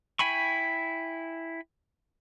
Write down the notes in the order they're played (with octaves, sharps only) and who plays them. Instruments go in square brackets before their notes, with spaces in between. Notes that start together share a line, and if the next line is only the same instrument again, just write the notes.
[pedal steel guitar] E4 G5 G#5 B5 C#6